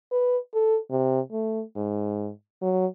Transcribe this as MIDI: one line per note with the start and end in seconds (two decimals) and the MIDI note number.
0.12 0.37 71
0.54 0.78 69
0.90 1.20 48
1.32 1.63 57
1.76 2.31 44
2.62 2.86 54